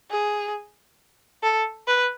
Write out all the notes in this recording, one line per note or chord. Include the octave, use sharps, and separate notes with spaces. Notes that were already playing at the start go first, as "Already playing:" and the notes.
G#4
A4
B4